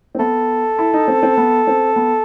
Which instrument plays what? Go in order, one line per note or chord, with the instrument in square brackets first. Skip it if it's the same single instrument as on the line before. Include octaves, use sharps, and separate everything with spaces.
[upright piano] C4
[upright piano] B3 [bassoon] A4
[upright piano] E4
D#4
C4
C4
B3
C4
B3